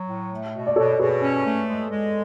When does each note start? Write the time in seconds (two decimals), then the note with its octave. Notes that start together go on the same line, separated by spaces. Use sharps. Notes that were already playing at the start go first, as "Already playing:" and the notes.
Already playing: F#3
0.08 A2
0.31 A3
0.54 B2
0.67 D5
0.76 B2 A4 C#5
0.99 B2 G#4 B4
1.21 C#4
1.45 A3
1.68 G#3
1.90 G#3